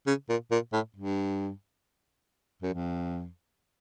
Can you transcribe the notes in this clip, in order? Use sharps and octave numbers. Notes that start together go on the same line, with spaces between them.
C#3
A#2
A#2
A2
G2
F#2
F2